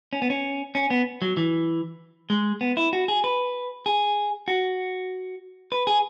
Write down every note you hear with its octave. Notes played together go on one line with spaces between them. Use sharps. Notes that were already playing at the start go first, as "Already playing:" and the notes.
C#4
B3
C#4
C#4
B3
F#3
E3
G#3
B3
E4
F#4
G#4
B4
G#4
F#4
B4
G#4